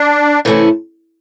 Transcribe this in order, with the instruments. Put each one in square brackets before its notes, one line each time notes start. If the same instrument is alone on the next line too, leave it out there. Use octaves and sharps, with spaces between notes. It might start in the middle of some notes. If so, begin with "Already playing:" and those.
Already playing: [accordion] D4
[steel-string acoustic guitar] C3 E3 A3 C#4 E4